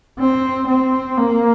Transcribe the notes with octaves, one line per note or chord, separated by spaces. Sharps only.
C4
C4
A#3